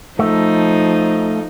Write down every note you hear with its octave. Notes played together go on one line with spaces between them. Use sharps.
F3 A3 D#4